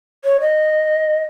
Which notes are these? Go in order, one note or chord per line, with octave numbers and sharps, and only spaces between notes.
C#5
D#5